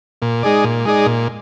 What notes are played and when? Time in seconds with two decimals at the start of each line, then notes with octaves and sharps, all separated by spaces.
0.22 A#2
0.43 G#3 D#4 G#4 D5
0.64 A#2
0.85 G#3 D#4 G#4 D5
1.06 A#2